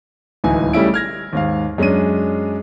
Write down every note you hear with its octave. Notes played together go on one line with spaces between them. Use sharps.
D1 C#2 E3 D#4 G#5
C#3 G3 A3 C#4 E4 D7
F6 G#6 A#6
D#2 G#2 F5
F#2 G#3 C#4 D4 D#7